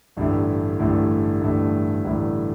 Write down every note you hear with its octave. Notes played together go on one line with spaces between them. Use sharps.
A1 G2 D3 A3 E4
A1 G2 D3 A3 E4
A1 G2 D3 A3 E4
A1 G2 D3 A3 E4